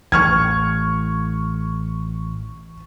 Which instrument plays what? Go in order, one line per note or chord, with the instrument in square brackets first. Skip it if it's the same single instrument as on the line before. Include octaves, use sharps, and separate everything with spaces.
[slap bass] A1 A2 [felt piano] C#6 F6 G#6